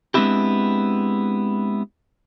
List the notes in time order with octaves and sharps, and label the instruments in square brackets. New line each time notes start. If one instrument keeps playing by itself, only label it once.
[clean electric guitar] G#3 B3 C4 D4 E4 G4